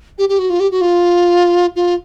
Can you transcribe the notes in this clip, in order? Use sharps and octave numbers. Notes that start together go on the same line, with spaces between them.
G4
G4
F#4
F4
G4
F#4
F4
F4